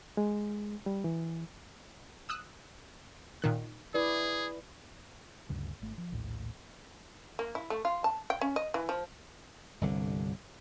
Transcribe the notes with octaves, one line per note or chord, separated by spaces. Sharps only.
G#3
G3
E3
D#6 E6 F#6
A#2 D#3 F#6
E4 G#4 B4 D5
D2 G2 C#3
G#1 A3
F3
A#1 D#2 A2
A#3
E4
A3
F4
A5
G5
C#4
D#5
E3
F3
G1 C2 D3